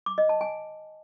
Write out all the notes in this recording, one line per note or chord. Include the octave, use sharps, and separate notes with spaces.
D6
D#5
A5
G#5